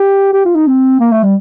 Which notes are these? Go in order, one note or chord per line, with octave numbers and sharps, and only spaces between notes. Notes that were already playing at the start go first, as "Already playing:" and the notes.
Already playing: G4
G4
F4
D#4
C4
A#3
A3
G3